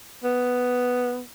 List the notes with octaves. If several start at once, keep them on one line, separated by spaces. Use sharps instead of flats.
B3